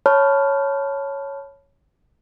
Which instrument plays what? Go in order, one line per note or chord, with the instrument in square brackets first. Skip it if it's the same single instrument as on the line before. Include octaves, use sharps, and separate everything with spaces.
[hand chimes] C#5 A5 B5 F6